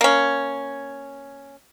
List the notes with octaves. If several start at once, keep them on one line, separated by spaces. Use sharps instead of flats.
A#3 C#4